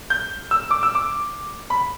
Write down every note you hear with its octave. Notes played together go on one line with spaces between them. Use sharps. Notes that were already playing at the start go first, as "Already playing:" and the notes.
G6
E6
D6
E6
D6
B5